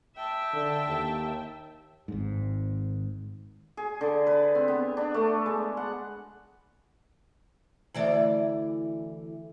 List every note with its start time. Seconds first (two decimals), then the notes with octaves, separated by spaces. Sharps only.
0.15 E5 G5 A5
0.53 D3
0.88 D#2
2.08 G#1 G#2
3.77 G#4
4.01 D3
4.27 B4
4.55 C4
4.68 B3
4.97 D4
5.14 A3
5.46 G#3
5.77 F#5
7.94 D2 E3 D5